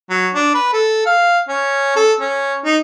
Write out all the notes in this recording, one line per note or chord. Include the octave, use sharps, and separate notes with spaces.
F#3
D4
B4
A4
F5
C#4
A4
C#4
D#4